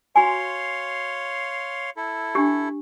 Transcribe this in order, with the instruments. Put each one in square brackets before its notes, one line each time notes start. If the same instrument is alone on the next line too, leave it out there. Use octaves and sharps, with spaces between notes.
[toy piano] F#4 G#5 [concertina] C#5 F5 C6
[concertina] E4 A4
[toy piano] D4 G4